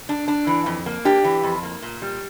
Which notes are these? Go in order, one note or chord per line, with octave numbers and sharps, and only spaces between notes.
D4
D4
E3
F2
A#3
D4 G4
E3
F2
A#3
A#2
G3